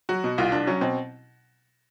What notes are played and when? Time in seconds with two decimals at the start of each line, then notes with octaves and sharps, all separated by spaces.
0.09 F#3 F#4
0.24 B2
0.38 C2 F4
0.52 C2 D4
0.67 F#3 C#4
0.81 B2 C4